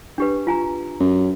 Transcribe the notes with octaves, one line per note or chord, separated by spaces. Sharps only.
D4 G4 B4
F4 G#5 A#5
F#2